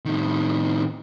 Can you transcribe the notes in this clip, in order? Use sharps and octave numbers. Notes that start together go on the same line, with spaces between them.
A2 D#3